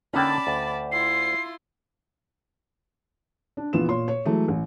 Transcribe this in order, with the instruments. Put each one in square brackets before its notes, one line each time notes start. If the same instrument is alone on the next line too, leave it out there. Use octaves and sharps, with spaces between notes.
[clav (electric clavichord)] D3 A#3 D#4 [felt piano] C#4 G5 [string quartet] D5 A5 B5
[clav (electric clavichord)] D2
[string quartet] E4 F4 C6 [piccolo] C7
[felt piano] D4
A#1 E3 B3 F4 E7
A#2 C#5 C6
C#5
E3 F#3 G#3 A3
A1